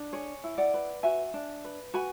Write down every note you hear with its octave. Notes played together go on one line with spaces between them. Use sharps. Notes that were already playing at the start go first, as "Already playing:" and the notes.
Already playing: D4
G#4 C#5
E4
D5 F#5
B4
F#4 E5 G#5
D4
B4
F#4 G#5 B5